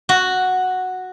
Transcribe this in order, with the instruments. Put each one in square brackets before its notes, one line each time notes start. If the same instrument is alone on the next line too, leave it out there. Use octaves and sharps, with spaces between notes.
[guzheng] F#4